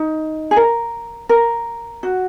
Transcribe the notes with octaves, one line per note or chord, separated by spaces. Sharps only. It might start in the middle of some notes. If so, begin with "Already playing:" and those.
Already playing: D#4
G#4
A#4
A#4
F#4